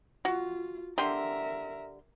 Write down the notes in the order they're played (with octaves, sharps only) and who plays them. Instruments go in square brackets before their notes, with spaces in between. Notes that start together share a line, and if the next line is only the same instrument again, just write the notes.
[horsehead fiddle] F4 [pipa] F#4
[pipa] D3 G4 C6 [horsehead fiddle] A#4 E5